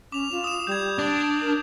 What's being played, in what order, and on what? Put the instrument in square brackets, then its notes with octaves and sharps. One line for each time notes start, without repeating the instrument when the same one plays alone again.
[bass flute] C#4 [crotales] D6 F7
[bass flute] F4
[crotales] D#6 E7
[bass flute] G3 [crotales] G6 G#6
[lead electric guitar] D4
[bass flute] A#4